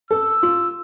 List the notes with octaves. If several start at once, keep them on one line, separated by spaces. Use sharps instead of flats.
A4 E6
F4